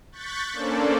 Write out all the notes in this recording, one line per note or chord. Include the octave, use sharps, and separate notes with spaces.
C#6 F#6 G6 A6 B6
A#3 C#4 D4 A4 C5 D5